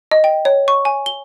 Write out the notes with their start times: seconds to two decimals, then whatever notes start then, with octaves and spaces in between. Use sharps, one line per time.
0.11 D#5
0.24 G5
0.45 C#5
0.68 C#6
0.85 G#5
1.06 G7